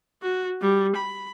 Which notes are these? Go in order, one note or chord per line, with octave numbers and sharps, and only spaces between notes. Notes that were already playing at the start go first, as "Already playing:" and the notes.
F#4
G3
B5